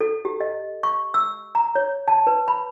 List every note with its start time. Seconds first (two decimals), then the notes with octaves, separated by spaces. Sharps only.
0.01 A4
0.25 G4
0.41 D#5
0.83 C#6
1.14 E6
1.55 A#5
1.75 C#5
2.08 A5
2.27 B4
2.48 B5